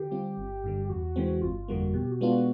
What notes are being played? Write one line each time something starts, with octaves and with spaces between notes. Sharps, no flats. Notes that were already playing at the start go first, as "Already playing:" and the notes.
Already playing: D3 G4
G3 C4 F4
G1
G2 D3 G3
G4
E2 F#4
C#3 E3 G#3 C4
G1 F4
F2 D3 G3 A#3 F#4
B2 G4
F#4
G#3 B3 D4 F4
F#4